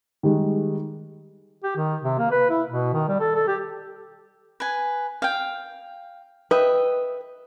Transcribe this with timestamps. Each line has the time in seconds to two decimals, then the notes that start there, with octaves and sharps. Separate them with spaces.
0.23 D#3 G3 G#3
1.64 G4
1.76 D#3
2.02 C3
2.19 A#3
2.31 B4
2.50 E4
2.69 B2
2.93 D#3
3.08 G3
3.20 A4
3.35 A4
3.48 G4
4.60 B4 G#5
5.22 F5 G5
6.51 B4 D#5 E5 G5